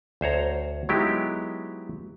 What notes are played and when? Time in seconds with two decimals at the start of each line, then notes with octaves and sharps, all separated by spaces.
0.21 D2 C5 C#5 A#5
0.89 F#3 G#3 B3 D#4 E4 G4